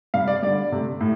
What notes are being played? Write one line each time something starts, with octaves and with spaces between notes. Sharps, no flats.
C3 G3 F5
D5
D3 G3 D5
C3 A3
A2